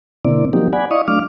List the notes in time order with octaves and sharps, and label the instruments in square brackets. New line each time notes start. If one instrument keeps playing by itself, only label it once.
[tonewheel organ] B2 D3 A#3 C4 E4 D5
F3 F#3 A#3 C4 D#4 G4
D5 F#5 G#5 B5
E4 D5 D#5 F5 C#6 D#6
F#3 A3 D4 F5 D6 F6